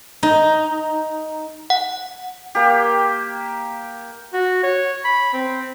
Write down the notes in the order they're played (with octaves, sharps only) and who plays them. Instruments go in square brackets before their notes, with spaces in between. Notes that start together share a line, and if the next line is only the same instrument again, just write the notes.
[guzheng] D#4
[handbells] F#5
[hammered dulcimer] A#3 G4
[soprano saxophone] F#4
C#5
B5
C4